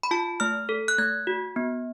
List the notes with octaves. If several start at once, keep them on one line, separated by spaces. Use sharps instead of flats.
B5
F4 A5
A3 F6
A4
F#6
A3 G#6
F#4
B3